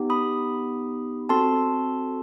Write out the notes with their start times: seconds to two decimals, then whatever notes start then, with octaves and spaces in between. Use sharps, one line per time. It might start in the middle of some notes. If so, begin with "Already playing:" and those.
Already playing: B3 D#4 G4
0.10 B5 D#6
1.29 C4 F#4 A4 A5 C6